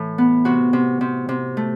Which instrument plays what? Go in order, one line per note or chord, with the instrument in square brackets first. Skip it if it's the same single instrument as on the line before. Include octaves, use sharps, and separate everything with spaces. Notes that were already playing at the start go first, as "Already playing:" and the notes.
Already playing: [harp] A2 E3 E5
B3
C3 F#4
C3
C3
C3
A3